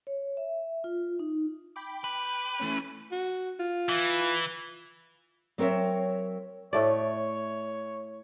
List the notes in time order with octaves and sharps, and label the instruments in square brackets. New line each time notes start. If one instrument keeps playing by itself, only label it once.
[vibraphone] C#5
E5
F4
D#4
[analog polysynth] G5 B5 D6
[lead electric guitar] B4
[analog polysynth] E3 A3 C#4
[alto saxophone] F#4
F4
[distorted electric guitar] E3
[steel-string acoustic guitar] F#3 C4 A#4 C#5 E5
[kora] A2 A3 D5 [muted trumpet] C#5